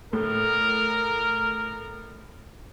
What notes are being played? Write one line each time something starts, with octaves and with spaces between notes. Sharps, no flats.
A2 A#4